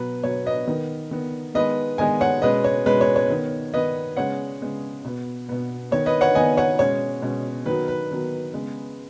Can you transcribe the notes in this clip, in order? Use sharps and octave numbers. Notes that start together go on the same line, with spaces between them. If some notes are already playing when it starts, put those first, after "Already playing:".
Already playing: B2 F#3 B3 B4
B2 F#3 B3 C#5
B4 D#5
D#3 B3
D#3 B3
D#3 G#3 B3 B4 D#5
D#3 G#3 B3 D#5 G#5
C#5 F#5
B2 G#3 C#4 B4 D#5
C#5
B2 G#3 C#4 B4
C#5
C#5
D#3 B3
D#3 B3 B4 D#5
C#3 G#3 B3 C#5 F#5
C#3 G#3 B3
B2 B3
B2 B3
D#3 B3 C#5
B4 D#5
C#5 F#5
D#3 B3 D#5 G#5
C#5 F#5
B2 G#3 C#4 C#5
B2 G#3 C#4
D#3 F#3 B3 B4
B4
D#3 F#3 B3
C#3 G#3 B3